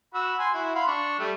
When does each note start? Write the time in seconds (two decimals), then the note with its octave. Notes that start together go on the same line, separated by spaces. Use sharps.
0.14 F#4 B5 E6
0.39 G#5 C6
0.54 E4 F#4
0.75 F5 B5 C6
0.88 D4 C#6
1.20 G3 A3